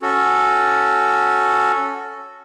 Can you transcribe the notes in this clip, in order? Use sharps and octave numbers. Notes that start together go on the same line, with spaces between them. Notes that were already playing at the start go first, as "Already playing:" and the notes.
C#4 F#4 A4